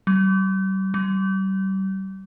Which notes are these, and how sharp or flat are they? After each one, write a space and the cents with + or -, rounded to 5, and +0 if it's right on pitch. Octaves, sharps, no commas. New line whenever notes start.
G3 -40
G3 -35